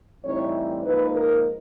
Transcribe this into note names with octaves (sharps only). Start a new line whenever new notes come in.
A2 E3 G3 C4 D#4 C#5
G#2 F3 A#3 D#4 B4
A#4